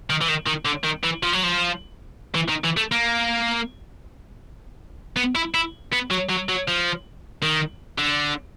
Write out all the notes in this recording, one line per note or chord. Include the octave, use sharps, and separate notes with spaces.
D#3
E3
D#3
D#3
D3
D#3
E3
F3
F#3
F3
E3
D#3
E3
A3
A#3
B3
E4
E4
B3
F#3
F#3
F#3
F3
D#3
D3